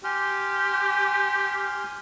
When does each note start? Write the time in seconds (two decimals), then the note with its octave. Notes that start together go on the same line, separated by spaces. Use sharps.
0.04 G4 G#5 C6 F6